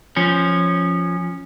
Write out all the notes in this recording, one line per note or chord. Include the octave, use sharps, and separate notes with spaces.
F3 C#4